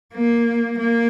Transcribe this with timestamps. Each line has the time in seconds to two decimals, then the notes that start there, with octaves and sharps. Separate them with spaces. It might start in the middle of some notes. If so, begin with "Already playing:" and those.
0.14 A#3
0.79 A#3